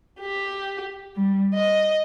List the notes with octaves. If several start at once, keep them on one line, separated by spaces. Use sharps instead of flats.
G4
G3
D#5